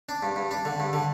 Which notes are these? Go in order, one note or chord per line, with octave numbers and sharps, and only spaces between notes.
D4
G2
G2
D4
D3
G2
D3